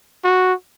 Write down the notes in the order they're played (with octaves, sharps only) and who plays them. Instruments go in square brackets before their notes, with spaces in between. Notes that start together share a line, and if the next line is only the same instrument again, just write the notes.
[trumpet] F#4